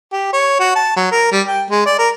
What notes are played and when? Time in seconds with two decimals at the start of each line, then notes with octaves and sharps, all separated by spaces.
0.13 G4
0.33 C#5
0.59 F#4
0.76 A5
0.96 F#3
1.12 A#4
1.32 G3
1.47 G5
1.70 G#3
1.86 D5
1.99 A#4